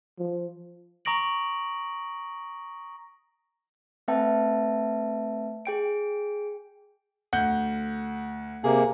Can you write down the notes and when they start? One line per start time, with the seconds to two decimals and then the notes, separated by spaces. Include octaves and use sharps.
0.19 F3
1.05 A#5 C#6 D#6 A#6 D7 F#7
4.08 A3 C4 B4 E5 G5 A5
5.65 G#4 G5 D7
7.33 D2 F#5 G6
8.64 C3 A#3 G#4